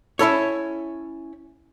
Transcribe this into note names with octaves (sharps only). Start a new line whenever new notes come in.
C#4 E4 A4 C#5